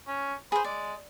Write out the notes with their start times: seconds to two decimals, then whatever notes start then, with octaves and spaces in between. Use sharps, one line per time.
0.07 C#4
0.52 G#4 B4 C5
0.64 G#3 D5